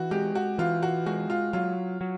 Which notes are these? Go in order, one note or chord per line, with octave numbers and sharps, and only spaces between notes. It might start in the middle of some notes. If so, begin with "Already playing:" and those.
Already playing: E3 F#4
G#3 G4
F#4
E3 F4
F#4
G#3 F#4
F4
F#3 F4
F#3